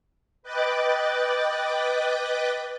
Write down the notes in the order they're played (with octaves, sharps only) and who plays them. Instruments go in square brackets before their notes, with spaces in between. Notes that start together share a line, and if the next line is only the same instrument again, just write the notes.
[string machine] B4 D#5 G5 D6 F#6 A6